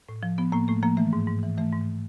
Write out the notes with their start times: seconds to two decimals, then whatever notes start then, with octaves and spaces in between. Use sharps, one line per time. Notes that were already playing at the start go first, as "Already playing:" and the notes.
0.09 A2
0.23 F3
0.38 F3 B3
0.52 A2 A#3
0.68 A2 A3
0.83 F3 A#3
0.97 E3 A3
1.13 G#2
1.27 G#2
1.43 E3
1.57 E3 A3
1.72 G#2